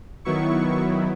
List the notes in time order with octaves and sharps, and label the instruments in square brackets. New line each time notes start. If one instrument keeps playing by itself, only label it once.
[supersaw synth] D#3 F#3 B3 E4 C#6